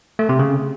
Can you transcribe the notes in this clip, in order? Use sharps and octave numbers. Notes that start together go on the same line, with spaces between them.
A3
C3
C#3